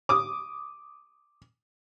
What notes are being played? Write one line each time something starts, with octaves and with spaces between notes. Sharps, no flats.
D6 D#6